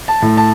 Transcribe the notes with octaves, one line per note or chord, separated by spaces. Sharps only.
A5
A2
A5